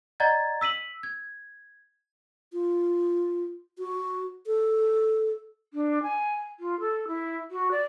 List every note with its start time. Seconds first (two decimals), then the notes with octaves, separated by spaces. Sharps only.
0.20 D5 D#5 F#5 A#5 G#6 A6
0.61 E6 B6 D#7 F#7
1.03 G#6
2.52 F4
3.79 F#4
4.47 A4
5.74 D4
6.03 G#5
6.60 F4
6.80 A4
7.07 E4
7.51 F#4
7.71 D5